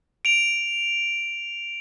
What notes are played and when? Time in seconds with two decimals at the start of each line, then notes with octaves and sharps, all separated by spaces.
0.25 D7 F7